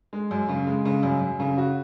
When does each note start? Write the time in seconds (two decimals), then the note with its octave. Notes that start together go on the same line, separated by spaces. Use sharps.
0.13 G#3
0.31 F#2
0.48 C#3
0.67 G#3
0.85 C#3
1.03 F#2
1.21 F#2
1.40 C#3
1.58 F#4